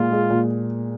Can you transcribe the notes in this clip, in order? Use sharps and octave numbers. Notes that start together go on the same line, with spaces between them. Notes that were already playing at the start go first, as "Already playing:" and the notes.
Already playing: A#2 G#3 F4
G#3
A#2